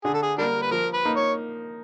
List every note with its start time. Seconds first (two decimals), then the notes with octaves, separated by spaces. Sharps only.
0.04 D3 G#4
0.14 A4
0.23 G#4
0.38 G3 A#3 D4 A#4
0.62 B4
0.71 F3 A#4
0.94 B4
1.05 A#3 D#4
1.17 C#5